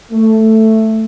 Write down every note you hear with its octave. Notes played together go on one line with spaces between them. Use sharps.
A3